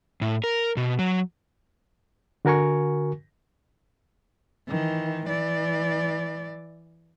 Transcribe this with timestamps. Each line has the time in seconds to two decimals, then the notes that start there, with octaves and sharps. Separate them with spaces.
0.22 A2
0.44 A#4
0.77 B2
0.99 F#3
2.45 D3 F#4 A#4 G#5 C#6
4.68 D#3 E3
5.26 E3 D5